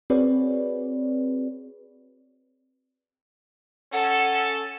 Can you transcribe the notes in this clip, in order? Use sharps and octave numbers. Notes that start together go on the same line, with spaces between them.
C4 F#4 G#4 B4 C#5 D5
C#4 A4 F#5